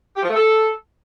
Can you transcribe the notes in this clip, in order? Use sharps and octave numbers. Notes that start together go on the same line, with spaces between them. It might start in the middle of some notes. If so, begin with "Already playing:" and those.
G4
F3
A3
A4